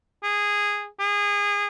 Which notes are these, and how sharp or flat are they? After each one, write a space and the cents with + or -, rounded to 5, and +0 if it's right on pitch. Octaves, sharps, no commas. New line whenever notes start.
G#4 -10
G#4 -25